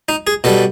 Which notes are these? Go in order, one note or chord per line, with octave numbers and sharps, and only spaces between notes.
D#4
G#4
B2 G3 A4